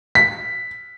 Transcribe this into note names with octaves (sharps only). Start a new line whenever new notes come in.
B6